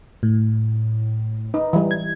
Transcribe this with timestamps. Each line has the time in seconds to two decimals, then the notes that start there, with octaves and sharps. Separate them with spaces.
0.23 A2
1.54 D#4 B4
1.73 E3 G3
1.91 G#6